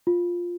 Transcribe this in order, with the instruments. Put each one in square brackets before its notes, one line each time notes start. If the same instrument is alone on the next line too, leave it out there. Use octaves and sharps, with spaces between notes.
[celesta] F4